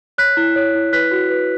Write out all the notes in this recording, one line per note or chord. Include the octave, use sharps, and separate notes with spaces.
C#5 F#6 B6
E4
C#5
E4
B4 F#6 B6
F#4
B4